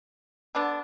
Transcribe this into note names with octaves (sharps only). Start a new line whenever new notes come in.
D3 B3 D4